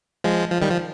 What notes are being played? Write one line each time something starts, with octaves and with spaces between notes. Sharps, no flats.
F3 G#3
F3
D#3 G3
F3